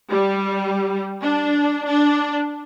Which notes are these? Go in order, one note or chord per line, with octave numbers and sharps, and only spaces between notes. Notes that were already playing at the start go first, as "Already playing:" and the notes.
G3
D4
D4